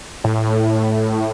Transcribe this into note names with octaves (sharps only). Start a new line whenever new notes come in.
A2